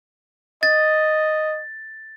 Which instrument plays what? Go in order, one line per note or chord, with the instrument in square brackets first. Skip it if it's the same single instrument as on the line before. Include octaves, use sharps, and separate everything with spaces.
[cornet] D#5 [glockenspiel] A6